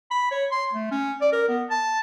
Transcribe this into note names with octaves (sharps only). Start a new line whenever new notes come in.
B5
C#5
C6
A3
C#4
D5
A#4
B3
A5